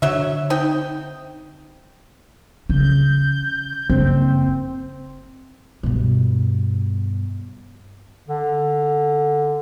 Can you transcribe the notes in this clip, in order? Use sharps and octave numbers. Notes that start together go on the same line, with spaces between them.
D3 F#3 E5
C4 D#4 G5
C#3 G6
F#1 C4
G2 B2
D3